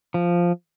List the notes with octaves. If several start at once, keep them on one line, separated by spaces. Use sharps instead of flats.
F3